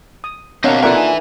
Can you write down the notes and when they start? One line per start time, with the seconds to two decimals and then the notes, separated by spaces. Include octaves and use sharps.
0.24 D#6
0.64 B2 A#3 C4 D4 C#5 D#5 F5 F#5
0.83 A#3 D4 F4 A4 B4 E5 F#5
0.96 D#4 G#5